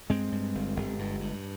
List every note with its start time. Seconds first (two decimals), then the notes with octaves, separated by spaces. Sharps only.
0.10 G2 G#3 C4
0.32 G2
0.55 G1
0.76 G1
0.99 G2
1.20 G2